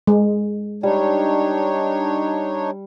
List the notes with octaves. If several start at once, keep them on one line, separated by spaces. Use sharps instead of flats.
G#3
G3 D4 D#4 C#5